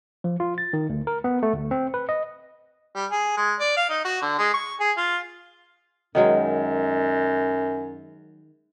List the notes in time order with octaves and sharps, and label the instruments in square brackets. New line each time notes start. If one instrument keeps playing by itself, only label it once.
[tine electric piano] F3
F4
A6
D#3
D2
A#4
B3
A3
D2
C4
B4
D#5
[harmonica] G3
G#4
G#3
D5
F5
D#4
F#4
D3
G#3
C#6
G#4
F4
[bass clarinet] F#2 [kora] D#3 F#3 G#3